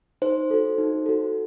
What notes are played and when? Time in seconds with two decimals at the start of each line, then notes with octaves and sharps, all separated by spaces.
0.22 D#4 C5
0.51 F#4 A4
0.78 D#4
1.06 F#4 A4